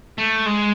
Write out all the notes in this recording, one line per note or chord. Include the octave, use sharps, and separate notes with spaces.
A3
G#3